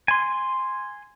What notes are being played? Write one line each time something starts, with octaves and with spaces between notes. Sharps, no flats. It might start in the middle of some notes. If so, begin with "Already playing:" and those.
G#5 C6